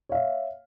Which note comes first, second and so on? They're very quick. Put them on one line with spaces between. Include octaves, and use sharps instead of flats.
C#5 F5 E5